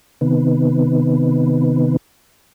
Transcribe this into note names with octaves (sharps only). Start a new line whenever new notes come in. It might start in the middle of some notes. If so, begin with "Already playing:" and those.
C3 D#3 B3